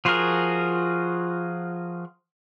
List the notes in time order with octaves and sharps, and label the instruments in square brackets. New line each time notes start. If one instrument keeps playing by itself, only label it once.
[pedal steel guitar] F3 F4 F#4 G#4 A#4